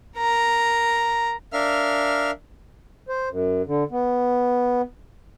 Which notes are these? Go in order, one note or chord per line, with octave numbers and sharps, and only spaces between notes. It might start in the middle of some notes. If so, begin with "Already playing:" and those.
A#4 A#5
D4 A#4 E5 F5 F6
C5
F#2
D3
B3